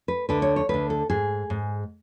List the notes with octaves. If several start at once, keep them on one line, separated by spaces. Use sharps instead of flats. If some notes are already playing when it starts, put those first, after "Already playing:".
B4
D2 D3 B4
C#5
C#5
D2 D3 B4
A4
G#2 G#4
G#2